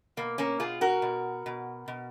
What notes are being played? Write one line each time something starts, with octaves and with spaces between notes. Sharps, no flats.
B2 A#3
A#3 C#4
B2 F4 G#4
F#4 A#4
B2
B2
B2